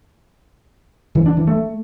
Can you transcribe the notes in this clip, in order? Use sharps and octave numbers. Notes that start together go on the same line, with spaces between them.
E3
D4
E3
A3